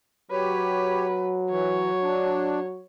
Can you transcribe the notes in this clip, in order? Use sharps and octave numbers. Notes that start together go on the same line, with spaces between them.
F#3 G4 B4 C#5
E3 C#5
D4